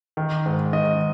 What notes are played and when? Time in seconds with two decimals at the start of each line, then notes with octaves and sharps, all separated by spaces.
0.17 D#3
0.46 G#2
0.73 D#3 D#5